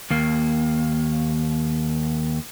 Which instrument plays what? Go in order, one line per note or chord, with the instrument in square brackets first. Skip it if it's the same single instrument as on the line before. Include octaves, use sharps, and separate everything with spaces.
[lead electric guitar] D#2 A#3